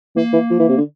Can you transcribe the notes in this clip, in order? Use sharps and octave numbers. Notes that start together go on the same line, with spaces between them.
E3 A#3
E3
F3
E3
C3
D3